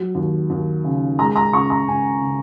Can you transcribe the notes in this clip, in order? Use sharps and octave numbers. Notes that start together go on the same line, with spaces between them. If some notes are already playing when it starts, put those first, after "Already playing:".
Already playing: F#3
D#2
D#2
C#3
G#3 A#5
A#5
C#2 C#6
A#5
C#2 G#5
C#3